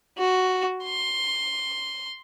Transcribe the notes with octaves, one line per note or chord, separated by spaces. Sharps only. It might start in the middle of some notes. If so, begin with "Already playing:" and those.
F#4
C6